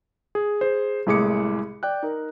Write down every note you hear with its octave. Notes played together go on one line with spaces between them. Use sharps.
G#4
G#4 C5
C2 A2 G#3 G#4 D6 C#7
D5 G5 F#6
D#4 A#4